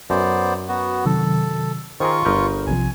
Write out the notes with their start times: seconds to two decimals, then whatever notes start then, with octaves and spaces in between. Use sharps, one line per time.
0.10 F#2 B3 C5 D5 A#5
0.68 B3 F#4
1.05 C3 D#3 F#3 A4
2.00 D#3 F4 G#4 A#4 C5 C#6
2.25 G1 A#4 B4 D#6 G6
2.67 B1 C3 F3 G#5